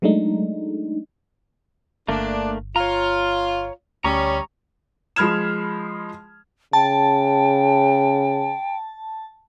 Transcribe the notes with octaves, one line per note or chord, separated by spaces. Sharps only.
F#3 G#3 A3 D4 D#4
G1 A3 A#3 D4
F4 C#5 A#5
D2 G3 C#4 A#5 C#6 D#6
F3 G#3 B5 F6 G#6 E7
C#3 G5 A5